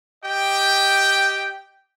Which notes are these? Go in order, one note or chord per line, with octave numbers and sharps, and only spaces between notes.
G4 D#5 G5